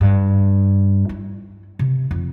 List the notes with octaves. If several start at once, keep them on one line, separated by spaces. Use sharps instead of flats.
G2
E4
C3
F2